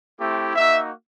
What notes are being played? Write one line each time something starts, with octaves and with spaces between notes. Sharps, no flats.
A3 C4 E4 G4
A#3 D#4 F#4 E5